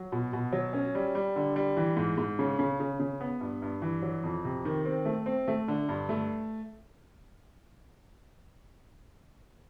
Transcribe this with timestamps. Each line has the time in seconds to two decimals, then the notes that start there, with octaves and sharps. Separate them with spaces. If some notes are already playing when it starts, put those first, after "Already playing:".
Already playing: F#3
0.12 B2
0.33 B2
0.53 F#3
0.73 C#4
0.95 G3
1.15 G3
1.36 D3
1.56 G3
1.77 E3
1.97 G#2
2.18 G#2
2.39 C#3
2.59 C#3
2.80 C#3
3.00 C#3
3.21 B3
3.41 G2
3.62 G2
3.82 E3
4.02 F#3
4.23 F2
4.45 C3
4.65 D#3
4.85 C4
5.05 A3
5.26 C4
5.48 A3
5.68 D3
5.89 G2
6.09 A3